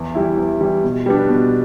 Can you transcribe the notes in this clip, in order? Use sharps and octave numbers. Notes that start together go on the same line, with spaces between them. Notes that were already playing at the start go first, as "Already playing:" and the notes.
Already playing: E2
E3 G3 E4
E2
E3 G3 E4
B2
G3 B3 D4
B2